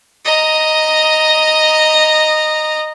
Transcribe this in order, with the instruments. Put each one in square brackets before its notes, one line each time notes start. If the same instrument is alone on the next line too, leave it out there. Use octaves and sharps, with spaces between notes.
[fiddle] D#5 A#5